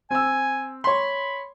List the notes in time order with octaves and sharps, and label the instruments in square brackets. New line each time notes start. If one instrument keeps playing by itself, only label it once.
[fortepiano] C4 E6 [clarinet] G#5
[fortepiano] C#5 C6 [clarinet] B5